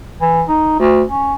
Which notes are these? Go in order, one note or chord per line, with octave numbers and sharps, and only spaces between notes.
E3
D#4
D2
C#4